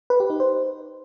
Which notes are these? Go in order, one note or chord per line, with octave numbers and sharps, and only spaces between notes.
B4
G4
D#4
C5